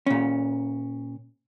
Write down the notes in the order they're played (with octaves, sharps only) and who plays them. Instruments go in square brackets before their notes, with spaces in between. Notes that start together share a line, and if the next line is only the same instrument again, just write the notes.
[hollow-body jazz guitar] A#2 C#4